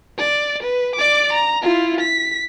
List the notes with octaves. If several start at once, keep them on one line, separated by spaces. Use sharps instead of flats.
D5
B4
D5 D6
A#5
E4 F4
B6